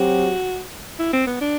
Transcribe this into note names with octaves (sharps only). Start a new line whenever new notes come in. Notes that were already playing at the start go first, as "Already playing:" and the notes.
Already playing: F#3 C4 F#4 G4
E4
C4
B3
D4